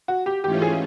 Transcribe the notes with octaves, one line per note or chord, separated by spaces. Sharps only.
F#4
G4
G#2 E3 A3 C#4 F4 G4
G#4